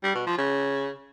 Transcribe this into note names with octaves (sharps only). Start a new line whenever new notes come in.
G3
B2
F3
C#3